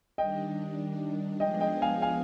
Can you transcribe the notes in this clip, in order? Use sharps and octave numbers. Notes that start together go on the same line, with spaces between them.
D#3 G3 D4 D#5 G5
F3 G#3 B3 D4 G#4 D#5 G5
D#5 G5
F5 G#5
F5 G#5